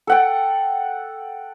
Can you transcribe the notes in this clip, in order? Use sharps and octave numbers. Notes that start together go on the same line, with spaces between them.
A4 F#5 G5